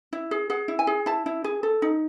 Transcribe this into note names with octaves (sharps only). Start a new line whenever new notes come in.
E4
G#4
G#4 F#5
E4
G#5
G#4
E4 A5
E4
G#4
A4
D#4